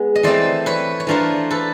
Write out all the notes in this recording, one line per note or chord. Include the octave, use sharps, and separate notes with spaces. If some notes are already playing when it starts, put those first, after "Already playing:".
Already playing: G#3 B3
D#5
E3 A3 C4 C5 D5
B4 C#5
C#5
E3 A3 D4 F4 A#4 C5
A4 B4